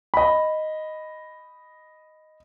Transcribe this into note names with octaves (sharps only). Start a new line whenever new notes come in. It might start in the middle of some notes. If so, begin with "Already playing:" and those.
D#5 B5